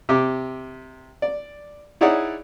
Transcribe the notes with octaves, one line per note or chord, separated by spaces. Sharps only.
C3 G4 D6
D5
D#4 E4 G#4 C#5 D5 F#5